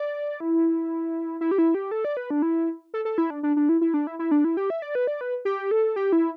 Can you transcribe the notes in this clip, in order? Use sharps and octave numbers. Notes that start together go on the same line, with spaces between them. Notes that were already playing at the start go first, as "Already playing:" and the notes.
Already playing: D5
E4
E4
G4
E4
G4
A4
D5
B4
D4
E4
A4
A4
E4
D4
D4
D4
E4
E4
D4
E4
E4
D4
E4
G4
E5
D5
B4
D5
B4
G4
A4
G4
E4